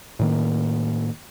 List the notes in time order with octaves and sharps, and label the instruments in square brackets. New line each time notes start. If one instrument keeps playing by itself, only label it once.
[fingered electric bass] A2 D#3 A#3